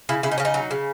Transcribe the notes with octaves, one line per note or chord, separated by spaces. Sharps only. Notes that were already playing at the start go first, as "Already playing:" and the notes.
C#3 E4
C#3 E4
D#4
C#3 C#4
D#4
F#3
C#3